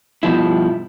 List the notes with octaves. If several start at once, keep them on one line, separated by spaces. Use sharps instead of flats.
G2 B2 F3 E4